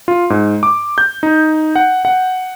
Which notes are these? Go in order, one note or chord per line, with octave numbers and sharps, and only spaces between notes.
F4
G#2
D6
G6
D#4
F#5
F#5